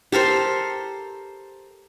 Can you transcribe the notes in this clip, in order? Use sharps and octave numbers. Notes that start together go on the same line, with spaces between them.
G4 A4 A#4 C5